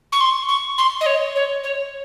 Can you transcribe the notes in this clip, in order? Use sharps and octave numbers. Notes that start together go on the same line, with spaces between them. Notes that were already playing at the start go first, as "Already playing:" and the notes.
C#6
C6
C#6
C6
D#5
C#5
C#5
C#5